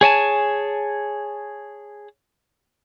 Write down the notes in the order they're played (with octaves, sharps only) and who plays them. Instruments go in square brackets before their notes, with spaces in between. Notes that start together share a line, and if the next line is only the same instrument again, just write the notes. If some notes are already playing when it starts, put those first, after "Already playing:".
[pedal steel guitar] G#4 C#5 G#5 A5